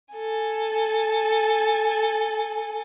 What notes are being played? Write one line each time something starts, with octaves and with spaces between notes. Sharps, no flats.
A4 G#5